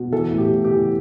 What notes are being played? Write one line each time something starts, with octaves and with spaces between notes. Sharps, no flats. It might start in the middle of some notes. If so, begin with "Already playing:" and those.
Already playing: B2
E3 A4
A2
G4
A2
G4
E3